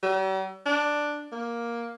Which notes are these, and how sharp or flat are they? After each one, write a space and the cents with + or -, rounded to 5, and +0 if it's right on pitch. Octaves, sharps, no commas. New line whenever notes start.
G3 -45
D4 +5
A#3 +10